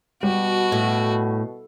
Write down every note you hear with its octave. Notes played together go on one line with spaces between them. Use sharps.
B2 G3 F#4
A2